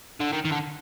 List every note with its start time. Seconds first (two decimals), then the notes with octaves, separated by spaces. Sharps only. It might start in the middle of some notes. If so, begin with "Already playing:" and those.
0.20 D3
0.33 D#3
0.45 D#3
0.52 D3